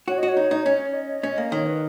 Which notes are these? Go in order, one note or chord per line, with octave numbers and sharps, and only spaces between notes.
F#4 C#5
F#4 D#5
C#5
D#4
D#4
C#4 C#5
D#5
C#4
A#3
D#3 C#5
B4